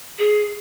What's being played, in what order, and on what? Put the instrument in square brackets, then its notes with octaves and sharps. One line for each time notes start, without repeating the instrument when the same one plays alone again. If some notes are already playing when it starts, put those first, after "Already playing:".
[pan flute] G#4